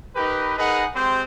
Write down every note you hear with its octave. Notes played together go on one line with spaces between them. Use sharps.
D#4 G4 A#4 B4
D#4 G#4 A#4 B4 D#5 F#5
G#3 C4 G4 C5